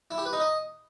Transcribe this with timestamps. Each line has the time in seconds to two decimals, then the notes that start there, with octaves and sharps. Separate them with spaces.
0.11 E4
0.18 G4
0.25 B4
0.33 D#4
0.40 D#5